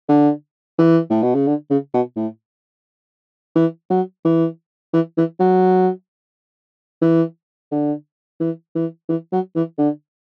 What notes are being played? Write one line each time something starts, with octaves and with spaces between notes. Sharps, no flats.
D3
E3
A2
B2
C#3
D3
C#3
B2
A2
E3
F#3
E3
E3
E3
F#3
E3
D3
E3
E3
E3
F#3
E3
D3